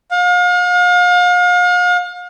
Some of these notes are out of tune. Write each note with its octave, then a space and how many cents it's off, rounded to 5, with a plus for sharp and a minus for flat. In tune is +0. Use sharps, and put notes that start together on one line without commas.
F5 +40